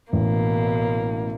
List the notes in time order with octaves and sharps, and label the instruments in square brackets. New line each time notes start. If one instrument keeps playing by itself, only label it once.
[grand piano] A1 [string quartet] B2 A#3